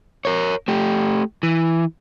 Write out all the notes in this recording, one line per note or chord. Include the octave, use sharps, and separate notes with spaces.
A#4 C#5
A3 G4
E3